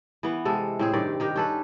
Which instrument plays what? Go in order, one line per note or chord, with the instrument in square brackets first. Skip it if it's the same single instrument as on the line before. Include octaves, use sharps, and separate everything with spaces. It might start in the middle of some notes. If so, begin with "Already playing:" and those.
[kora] E3 B3
C3 G#3 A4
A2 C4 G#4
G2 D#3 D5
D#3 D#4 G4
C#4 A4 B4